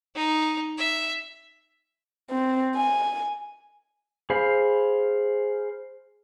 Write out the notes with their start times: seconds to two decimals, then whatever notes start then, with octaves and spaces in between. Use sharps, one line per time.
0.15 D#4
0.78 E5
2.31 C4
2.76 G#5
4.30 G#4 C5 F5 B5